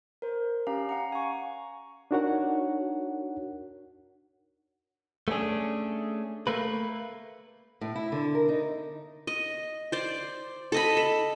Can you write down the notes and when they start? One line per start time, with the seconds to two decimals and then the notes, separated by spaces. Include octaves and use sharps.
0.22 A#4 C5
0.67 C#4 G4 F5 A#5
0.89 F5 F#5 A#5
1.12 G#5 C#6
2.11 D4 D#4 F#4 A#4 C#5 F#5
5.28 A3 B3 C#4 D4 G#4
6.47 A3 A#3 B4
7.81 A2
7.95 E4
8.12 D3
8.35 A#4
8.49 D#4
9.27 D#5
9.92 C5 D5
10.72 A4 D#5 B5
10.97 A4